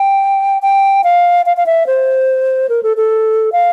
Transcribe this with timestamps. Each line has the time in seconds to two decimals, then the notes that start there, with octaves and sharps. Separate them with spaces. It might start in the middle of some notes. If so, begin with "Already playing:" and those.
Already playing: G5
0.62 G5
1.04 F5
1.46 F5
1.57 F5
1.66 E5
1.87 C5
2.69 A#4
2.83 A4
2.97 A4
3.52 F5